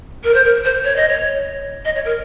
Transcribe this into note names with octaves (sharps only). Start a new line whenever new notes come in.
A#4
C5
A#4
C5
C#5
D#5
C#5
D#5
C#5
A#4